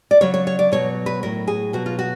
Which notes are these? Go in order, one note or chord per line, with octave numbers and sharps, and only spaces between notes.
D5
C#3 F#3 C#5
C#5
C#5
D5
B2 F#3 C#5
B4
A2 F#3 A#4
G#4
B2 F#3 F#4
F4
F#4